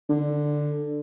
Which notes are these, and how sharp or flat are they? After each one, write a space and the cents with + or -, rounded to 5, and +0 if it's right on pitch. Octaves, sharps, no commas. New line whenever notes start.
D3 +5